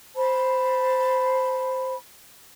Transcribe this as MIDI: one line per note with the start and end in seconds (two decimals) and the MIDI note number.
0.16 1.95 72
0.16 1.95 81
0.16 1.95 83